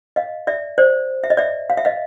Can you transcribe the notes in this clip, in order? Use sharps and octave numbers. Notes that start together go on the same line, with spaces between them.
D#5 F5
D5 E5
C5 D5
E5
D#5
D5 E5
F5
E5
D#5 F5